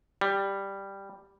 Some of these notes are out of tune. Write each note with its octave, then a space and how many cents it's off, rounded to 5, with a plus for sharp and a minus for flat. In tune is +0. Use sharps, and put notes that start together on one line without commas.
G3 +5